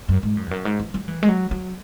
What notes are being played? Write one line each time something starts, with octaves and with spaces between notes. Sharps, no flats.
F#2
G#2
F#2
E2
F#2
G#2
E3
F#3
E3
G#3
F#3
F#3